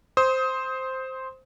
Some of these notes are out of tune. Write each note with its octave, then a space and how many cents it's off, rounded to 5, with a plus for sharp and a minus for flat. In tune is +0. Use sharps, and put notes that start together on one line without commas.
C5 +0 D#6 +30